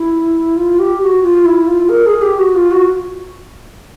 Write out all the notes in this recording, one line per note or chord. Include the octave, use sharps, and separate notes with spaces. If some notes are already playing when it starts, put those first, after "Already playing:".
Already playing: E4
F4
G4
F#4
F4
E4
F4
A#4
G#4
G4
F#4
F4
F#4